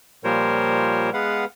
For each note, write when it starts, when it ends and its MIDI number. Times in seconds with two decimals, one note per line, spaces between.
0.24 1.10 46
0.24 1.10 53
0.24 1.10 55
0.24 1.10 70
0.24 1.10 72
0.24 1.10 73
1.14 1.45 56
1.14 1.45 59
1.14 1.45 71
1.14 1.45 77
1.14 1.45 78